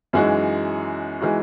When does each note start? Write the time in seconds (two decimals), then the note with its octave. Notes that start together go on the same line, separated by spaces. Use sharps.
0.13 F#2 E3 G#3 D#4 F#4
1.21 E3 G#3 D#4 F#4